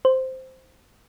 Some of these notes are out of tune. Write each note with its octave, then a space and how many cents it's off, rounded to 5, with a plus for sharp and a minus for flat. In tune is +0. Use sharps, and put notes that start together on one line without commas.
C5 -5